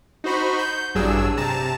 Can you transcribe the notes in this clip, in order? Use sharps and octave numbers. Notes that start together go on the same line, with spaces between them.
D#4 F#4 C5 B5 C#6
G6
A1 G2 F#3 D4 G#4 E6
C3 A5 A#5 E7